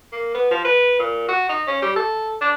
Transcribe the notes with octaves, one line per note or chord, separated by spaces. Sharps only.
A#3
B3
F3
B4
A#2
F#4
D#4
C#4
G3
A4
D4